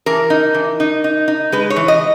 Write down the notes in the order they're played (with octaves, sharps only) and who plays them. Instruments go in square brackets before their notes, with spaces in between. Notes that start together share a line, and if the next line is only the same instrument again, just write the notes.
[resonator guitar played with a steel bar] E3 A#4
D#4
E3
D#4
D#4
D#4
G#3 B4
C#5
E3
D#5